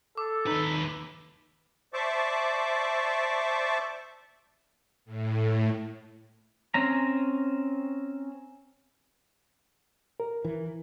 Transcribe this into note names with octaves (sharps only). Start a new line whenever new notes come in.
A4 D6
D#2 D#4 B4
C5 D5 E5 A5 C#6 D6
A2
C4 C#4 A#5
A#4
E3